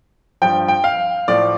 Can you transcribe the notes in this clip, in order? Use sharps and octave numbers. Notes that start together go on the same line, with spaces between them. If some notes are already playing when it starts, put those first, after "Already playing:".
G2 F3 G5
G5
F5
A2 F3 D5